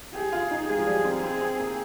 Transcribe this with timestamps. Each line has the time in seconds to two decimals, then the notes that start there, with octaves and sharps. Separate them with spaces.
0.15 G4 G#4
0.33 F4
0.51 D#4
0.69 G#3 G#4
0.78 F3
0.87 G3
1.05 C4
1.23 C4 G#4
1.41 C4
1.59 A#3